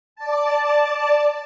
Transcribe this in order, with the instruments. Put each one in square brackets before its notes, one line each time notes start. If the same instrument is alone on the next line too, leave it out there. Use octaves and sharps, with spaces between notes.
[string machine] D5 A5